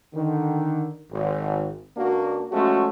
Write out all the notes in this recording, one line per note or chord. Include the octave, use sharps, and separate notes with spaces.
D3 D#3
G#1
C#2 A#3 D4 F#4
F3 G#3 A3 C#4 F#4